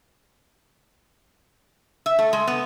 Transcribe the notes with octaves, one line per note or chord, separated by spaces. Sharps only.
E5
A3
G#3
B3